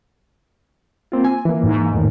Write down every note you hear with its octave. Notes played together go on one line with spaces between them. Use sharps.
A#3 C4 F4
G#5
E3 A#3
G#2
E2 A2 D#3